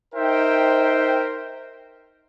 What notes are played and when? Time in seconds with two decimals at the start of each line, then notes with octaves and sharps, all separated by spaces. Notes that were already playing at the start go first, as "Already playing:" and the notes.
0.14 D#4 A#4 C5 E5 G5